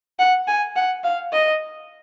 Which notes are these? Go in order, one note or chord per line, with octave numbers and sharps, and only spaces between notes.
F#5
G#5
F#5
F5
D#5